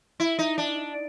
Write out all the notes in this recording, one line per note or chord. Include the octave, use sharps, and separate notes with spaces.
E4
D#4
D4